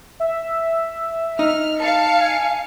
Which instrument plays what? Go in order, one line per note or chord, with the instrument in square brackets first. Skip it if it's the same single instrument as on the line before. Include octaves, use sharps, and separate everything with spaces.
[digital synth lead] E5
[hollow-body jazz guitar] D#4 [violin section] F6
[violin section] F5 C#7 [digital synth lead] A5
[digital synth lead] G#5